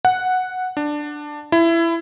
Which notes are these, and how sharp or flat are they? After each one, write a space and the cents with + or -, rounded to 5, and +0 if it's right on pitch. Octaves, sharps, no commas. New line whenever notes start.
F#5 -5
D4 +10
E4 +20